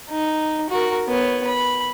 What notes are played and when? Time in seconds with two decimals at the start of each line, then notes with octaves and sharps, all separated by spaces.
0.10 D#4
0.70 F#4 A#4
1.08 B3 C#5
1.47 B5